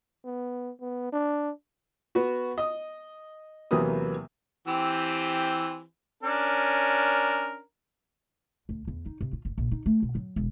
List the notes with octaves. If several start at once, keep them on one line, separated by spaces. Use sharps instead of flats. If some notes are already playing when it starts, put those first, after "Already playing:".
B3
B3
D4
B3 F#4
D#5 D#6
E2 C3 F#3 A#3 B3 D#6
E3 C4 G4
C#4 D4 A#4
D2
E2
D#4
C3
F4
F#1
A#1
D#4
A3
B2
F#3
E1